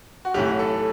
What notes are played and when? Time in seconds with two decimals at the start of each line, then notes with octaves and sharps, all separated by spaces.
0.25 F#4
0.34 B1 A2 E3 G4
0.59 A4